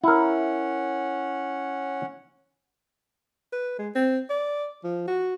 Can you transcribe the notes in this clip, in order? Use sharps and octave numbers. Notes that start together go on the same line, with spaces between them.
C#4 E4 A#4 F#5
B4
G#3
C4
D5
F3
F#4